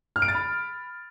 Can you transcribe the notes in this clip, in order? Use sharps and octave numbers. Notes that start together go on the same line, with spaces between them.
F6
D7
A6
B5